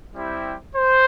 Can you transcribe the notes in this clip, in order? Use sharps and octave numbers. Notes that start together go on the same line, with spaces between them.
G3 C4 E4 G4
C5